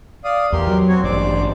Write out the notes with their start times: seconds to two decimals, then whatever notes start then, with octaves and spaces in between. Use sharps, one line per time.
0.24 D5 F5 D#6
0.52 E2 G4 A#4 C6
0.67 F#3
0.88 C4 F#4 C#5
1.04 A1 G2 C5 D5 D6